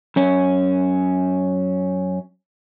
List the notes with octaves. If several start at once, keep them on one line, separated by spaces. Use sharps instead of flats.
F#2 C#4